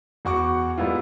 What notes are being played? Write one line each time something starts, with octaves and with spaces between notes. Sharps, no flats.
E2 F#4 C#6 D6
G#2 G3 B3 E4 F4